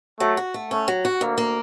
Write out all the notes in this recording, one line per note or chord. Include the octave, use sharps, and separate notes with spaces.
F#3 A3
F#4
A3
A3 C#4
F#3
F#4
D2 A#3
A#3